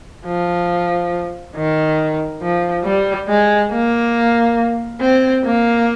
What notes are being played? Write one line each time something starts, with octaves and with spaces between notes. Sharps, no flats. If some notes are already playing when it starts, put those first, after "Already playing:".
F3
D#3
F3
G3
G#3
A#3
C4
A#3